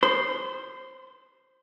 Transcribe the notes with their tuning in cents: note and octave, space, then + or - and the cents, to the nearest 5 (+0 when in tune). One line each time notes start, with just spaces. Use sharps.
C5 +0 C6 -45